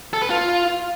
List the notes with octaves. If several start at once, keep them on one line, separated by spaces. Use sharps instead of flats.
A4
B4
F4